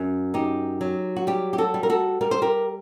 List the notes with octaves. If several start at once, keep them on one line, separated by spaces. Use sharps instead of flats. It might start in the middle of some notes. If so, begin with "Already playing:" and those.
Already playing: F#2
D#4 G4
F#3
F#4
G3 G4
G4
F#4 A4
G3
A#4
F#4 A4
G3 A#4
C5
G4 A#4